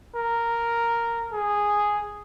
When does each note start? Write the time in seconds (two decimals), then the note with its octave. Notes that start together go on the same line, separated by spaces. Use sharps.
0.16 A#4
1.33 G#4